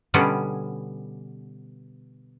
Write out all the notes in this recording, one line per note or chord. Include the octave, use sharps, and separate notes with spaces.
B2 D3 G3 B3 C#4